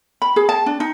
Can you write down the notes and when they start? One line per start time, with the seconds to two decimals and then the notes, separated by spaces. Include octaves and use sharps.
0.22 B5
0.36 G#4
0.49 A5
0.66 D4
0.80 D#4